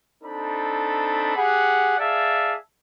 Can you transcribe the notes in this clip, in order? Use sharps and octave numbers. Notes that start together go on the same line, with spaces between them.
C4 D4 D#4 A4 B5
G4 G#4 F#5
G#4 D5 E5 F5 A5